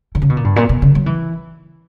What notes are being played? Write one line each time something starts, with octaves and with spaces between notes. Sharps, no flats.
D3
C#3
B2
A#2
G2
A#2
B2
C#3
F#3
E3